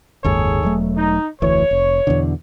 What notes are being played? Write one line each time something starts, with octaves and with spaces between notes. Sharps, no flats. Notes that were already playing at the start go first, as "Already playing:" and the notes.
F#1 D#2 G#2 G#4 A4 C#5
E1 F#3 A3
D#4
F1 D2 E3 C#5
F1
E2 B2 D3